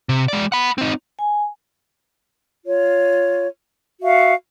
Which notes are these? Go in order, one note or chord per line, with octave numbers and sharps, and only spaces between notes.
C3
G#3 D5
F#5 B5
C4 D#4
G#5
F4 C#5
F#4 E5 F5